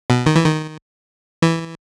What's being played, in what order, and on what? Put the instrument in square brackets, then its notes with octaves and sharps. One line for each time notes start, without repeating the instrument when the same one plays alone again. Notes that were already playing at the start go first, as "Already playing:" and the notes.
[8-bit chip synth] B2
D#3
E3
D#3
E3